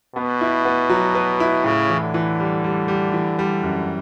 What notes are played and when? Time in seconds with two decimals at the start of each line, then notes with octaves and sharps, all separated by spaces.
0.15 B2 B3
0.41 E4
0.65 B3
0.90 F#3
1.15 B4
1.40 E4
1.64 A2 C#3
1.89 E3
2.01 D3
2.14 E3
2.40 G3
2.64 G3
2.88 G3
3.13 E3
3.39 G3
3.63 F#2